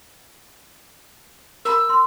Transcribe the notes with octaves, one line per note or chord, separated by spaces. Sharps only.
A#4 A#5 B5 E6
C6